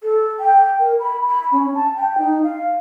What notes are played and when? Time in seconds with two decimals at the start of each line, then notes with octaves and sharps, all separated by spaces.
0.03 A4
0.40 G5
0.80 A#4
0.99 B5
1.26 B5
1.52 C#4
1.74 A5
1.96 G5
2.18 D#4
2.43 F5